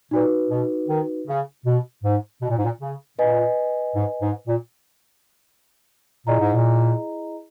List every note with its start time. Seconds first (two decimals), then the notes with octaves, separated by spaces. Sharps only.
0.11 A#2 D#4 F#4 B4
0.50 B2
0.88 D#3
1.27 C#3
1.65 B2
2.04 G#2
2.42 B2
2.50 A#2
2.57 G#2
2.64 A#2
2.81 C#3
3.19 A#2 B4 D#5 G#5
3.96 G#2
4.22 G#2
4.47 A#2
6.26 A#2 E4 G#4 D#5 A#5
6.40 G#2
6.54 A#2